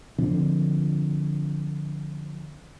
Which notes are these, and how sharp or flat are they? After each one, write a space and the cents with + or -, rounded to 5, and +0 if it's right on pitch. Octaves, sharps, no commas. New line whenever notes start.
D3 +0 F3 +0 C4 +0